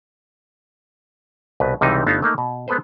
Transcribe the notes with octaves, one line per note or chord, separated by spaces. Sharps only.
C2 B2 B4
C#2 C3 E3 G3 D#4
G1 A3 B3 D#4 F5 A5
A3 A#3 D#4
B2
G#3 B3 A4 B4 C5